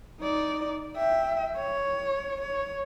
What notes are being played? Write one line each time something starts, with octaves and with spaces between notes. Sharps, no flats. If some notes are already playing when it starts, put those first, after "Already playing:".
D#4 D5
E5 G5
C#5
C#5